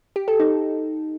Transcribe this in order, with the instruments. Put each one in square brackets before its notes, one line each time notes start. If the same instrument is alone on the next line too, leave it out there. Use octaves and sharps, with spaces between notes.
[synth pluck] G4
A4
D#4